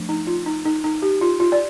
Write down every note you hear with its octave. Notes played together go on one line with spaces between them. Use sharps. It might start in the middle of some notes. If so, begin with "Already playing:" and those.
Already playing: F3 A3 D4
D#4
F4
D#4
D#4
D#4
G4
F4
F4
D5